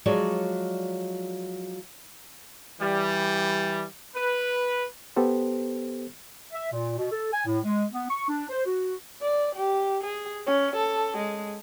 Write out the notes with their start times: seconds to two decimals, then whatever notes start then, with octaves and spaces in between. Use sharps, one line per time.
0.06 F3 F#3 G#3 C#5 D5
2.81 E3 G3
4.16 B4
5.16 B3 G4 A4 C5
6.53 E5
6.71 A#2
6.97 B2
7.12 A4
7.33 G#5
7.45 A2
7.64 G#3
7.93 B3
8.09 C#6
8.28 D4
8.50 C5
8.66 F#4
9.22 D5
9.56 G4
10.04 G#4
10.47 C#4
10.76 A4
11.18 G#3